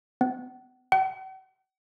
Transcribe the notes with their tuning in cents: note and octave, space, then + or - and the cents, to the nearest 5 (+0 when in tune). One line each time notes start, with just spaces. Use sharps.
B3 +40
F#5 +45